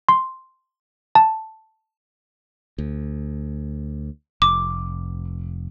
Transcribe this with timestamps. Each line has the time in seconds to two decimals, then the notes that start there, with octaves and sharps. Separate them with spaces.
0.09 C6
1.15 A5
2.78 D2
4.42 F1 D6